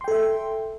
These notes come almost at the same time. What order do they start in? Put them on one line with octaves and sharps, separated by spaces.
C6 G5 A4 E5